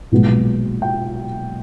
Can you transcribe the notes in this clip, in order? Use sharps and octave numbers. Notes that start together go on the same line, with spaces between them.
B1 A#2 F3 G#3 B3
G5